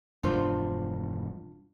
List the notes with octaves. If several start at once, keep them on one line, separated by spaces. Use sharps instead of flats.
E1 G2 F3 D4 F4 C5